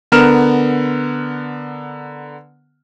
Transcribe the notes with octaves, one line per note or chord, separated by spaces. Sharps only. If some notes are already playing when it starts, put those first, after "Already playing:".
D3 B3 A#4 F6 E7